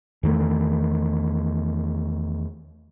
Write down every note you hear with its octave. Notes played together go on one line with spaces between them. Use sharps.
E2 D#3 A3